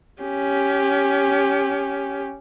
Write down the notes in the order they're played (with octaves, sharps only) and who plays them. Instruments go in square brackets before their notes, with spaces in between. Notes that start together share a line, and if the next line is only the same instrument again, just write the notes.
[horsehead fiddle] C#4 G4